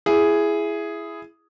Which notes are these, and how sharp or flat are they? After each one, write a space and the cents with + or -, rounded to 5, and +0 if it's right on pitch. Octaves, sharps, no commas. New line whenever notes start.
E4 +15 G#4 +0